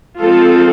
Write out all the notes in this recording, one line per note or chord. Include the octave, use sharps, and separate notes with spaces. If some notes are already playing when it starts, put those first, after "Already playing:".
F3 G#3 C4 F4 A4